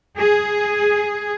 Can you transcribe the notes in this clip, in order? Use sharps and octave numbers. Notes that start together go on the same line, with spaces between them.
G#4